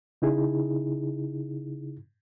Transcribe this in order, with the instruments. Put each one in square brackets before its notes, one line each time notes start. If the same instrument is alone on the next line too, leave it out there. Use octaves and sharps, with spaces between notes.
[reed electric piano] C#3 D#4 E4 G#4